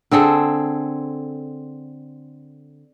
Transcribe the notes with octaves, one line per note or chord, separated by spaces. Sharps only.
D3 C4 G#4 A4